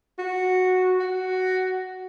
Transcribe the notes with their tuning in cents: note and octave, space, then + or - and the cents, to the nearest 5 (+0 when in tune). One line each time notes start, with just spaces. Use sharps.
F#4 -5
F#4 +10